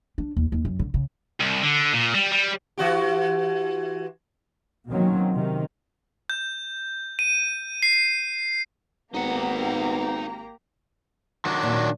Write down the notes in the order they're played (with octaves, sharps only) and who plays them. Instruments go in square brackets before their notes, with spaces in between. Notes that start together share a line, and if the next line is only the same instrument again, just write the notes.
[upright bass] D4
D#2
D#2
F#2
D3
C#3
[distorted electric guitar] C2
D3
A#2
G3
G3
[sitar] E3 F#4 G4
[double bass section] B2 D#3 F#3 A#3 C4 C#4
C3 D#3
[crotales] G6
D#7
C7
[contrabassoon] G#1 [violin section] A#3 G4 A#5 [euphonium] B3 [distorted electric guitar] D#4 F#5
[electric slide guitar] D#3 F#3 D4
[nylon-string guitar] D#2 A#2